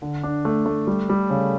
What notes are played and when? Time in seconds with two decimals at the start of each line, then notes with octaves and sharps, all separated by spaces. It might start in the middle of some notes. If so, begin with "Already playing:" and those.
0.02 D3
0.23 D4
0.45 A3
0.66 A3
0.87 G3
1.09 G3
1.30 C#3